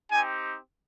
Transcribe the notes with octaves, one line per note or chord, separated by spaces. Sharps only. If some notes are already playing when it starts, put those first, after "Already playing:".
C4 D#4 G4 G#5